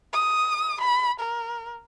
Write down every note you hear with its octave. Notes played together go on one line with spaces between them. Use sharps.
D#6
B5
A#4